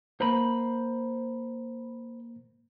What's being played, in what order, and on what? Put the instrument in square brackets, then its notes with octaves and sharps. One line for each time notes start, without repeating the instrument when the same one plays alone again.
[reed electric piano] A#3 A#5 [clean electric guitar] C5 B5